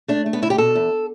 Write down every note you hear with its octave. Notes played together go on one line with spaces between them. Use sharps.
A3 D4
A3
B3
D2 E4
G4
B2 A4
E2